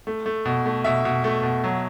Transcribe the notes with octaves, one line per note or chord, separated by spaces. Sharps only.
A3
A3
B2
A3
B2 E5
B2
A3
B2
F#3